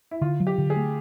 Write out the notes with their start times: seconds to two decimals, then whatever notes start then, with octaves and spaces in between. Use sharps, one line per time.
0.11 E4
0.21 D3 F4
0.40 F#3
0.47 G4
0.58 D3
0.70 G#4
0.76 A3